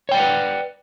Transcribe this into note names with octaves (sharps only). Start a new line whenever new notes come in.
B4 C#5 D5 F#5 G5